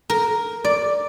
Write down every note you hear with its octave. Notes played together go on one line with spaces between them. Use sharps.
A#4
D5